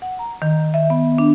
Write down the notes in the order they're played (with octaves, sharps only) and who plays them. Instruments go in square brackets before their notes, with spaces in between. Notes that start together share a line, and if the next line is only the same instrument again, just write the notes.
[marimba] F#5
A#5
D#3
E5
B3
D4